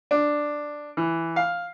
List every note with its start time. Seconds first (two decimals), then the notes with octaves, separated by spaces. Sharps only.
0.11 D4
0.97 E3
1.36 F5